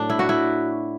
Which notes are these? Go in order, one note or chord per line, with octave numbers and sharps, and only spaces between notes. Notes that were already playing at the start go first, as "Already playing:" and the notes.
Already playing: A2 F#3 D4
E4
F#4
E4